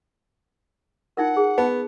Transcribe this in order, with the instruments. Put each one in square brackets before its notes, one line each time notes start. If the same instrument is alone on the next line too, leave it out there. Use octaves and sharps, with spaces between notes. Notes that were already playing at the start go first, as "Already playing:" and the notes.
[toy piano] D#4 F4 A#4 [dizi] F#5
[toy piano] G#4
[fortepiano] B3 [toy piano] A5